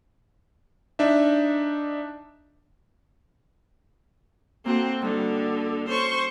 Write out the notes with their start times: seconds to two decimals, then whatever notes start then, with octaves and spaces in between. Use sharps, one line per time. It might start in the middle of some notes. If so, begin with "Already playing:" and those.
0.99 D4 D#4 E5
4.66 A#3 C4 F#4 A4
5.02 D3 G3 D#4
5.89 C#4 A4 C5 C#6